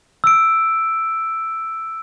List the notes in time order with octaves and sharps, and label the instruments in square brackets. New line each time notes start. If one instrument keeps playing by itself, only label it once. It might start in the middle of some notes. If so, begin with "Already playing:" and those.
[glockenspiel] E6 D7